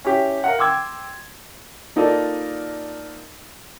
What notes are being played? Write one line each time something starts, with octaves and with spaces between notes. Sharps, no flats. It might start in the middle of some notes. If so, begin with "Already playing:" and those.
C#4 E4 G4
A#4 F5 F#5
G5 C6 D6 E6 G#6
A#3 D#4 F4 A4 D5 D#5